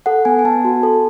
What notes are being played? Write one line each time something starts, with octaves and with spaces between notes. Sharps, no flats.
A4 F#5
B3 G#5
G#5
B3 A5
F#4
A4